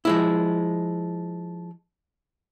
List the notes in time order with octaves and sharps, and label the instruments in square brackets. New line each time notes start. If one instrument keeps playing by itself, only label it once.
[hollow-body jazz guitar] F3 G#3 E4